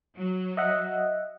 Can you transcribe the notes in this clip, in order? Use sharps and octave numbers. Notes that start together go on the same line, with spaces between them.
F#3
D#5 E5 F#5